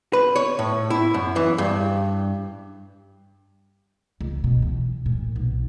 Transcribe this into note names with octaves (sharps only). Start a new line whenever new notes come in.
B4
C#5
A2
E4
F#2
E3
G2
C#2
B2
E3
A#2
B1